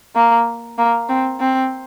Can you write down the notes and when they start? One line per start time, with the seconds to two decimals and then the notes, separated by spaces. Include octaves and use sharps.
0.16 A#3
0.78 A#3
1.09 C4
1.40 C4